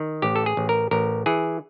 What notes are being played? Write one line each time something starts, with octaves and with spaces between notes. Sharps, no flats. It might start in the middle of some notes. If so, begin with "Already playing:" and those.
Already playing: D#3
A1 G4
A4
G#4
A1
A#4
A1 A#4
E3 G#4